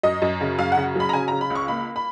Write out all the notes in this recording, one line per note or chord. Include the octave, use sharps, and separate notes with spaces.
F#2 D#5
F#2
C#3
F#2 F5
F#5
C#3
F#3 B5
A#5
C#3 G#5
C#3 A#5
B5
C#2
C#6
A#3 B5
B5